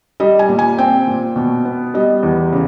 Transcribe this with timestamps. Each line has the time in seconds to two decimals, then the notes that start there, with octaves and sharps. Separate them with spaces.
0.20 G3 D#5
0.39 G#5
0.49 A#2
0.59 G#5
0.78 C4 G5
1.07 A#2
1.36 B2
1.65 B3
1.94 G3 D#5
2.23 E2
2.52 C#3